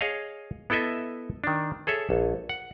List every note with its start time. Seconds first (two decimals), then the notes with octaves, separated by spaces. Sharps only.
0.01 G#4 C#5 D#5 F5
0.70 B3 E4 A4 D#5 E5
1.44 D#3 D4
1.87 G#4 A4 C#5 E5
2.10 A#1
2.49 F#5